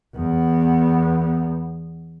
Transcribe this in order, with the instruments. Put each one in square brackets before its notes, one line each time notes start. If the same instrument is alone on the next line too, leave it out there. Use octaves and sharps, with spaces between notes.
[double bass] E2 B3